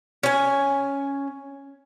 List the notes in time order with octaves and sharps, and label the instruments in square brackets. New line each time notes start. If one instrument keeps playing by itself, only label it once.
[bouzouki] C#4 G#5